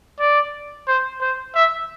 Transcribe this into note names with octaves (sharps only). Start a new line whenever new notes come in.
D5
C5
C5
E5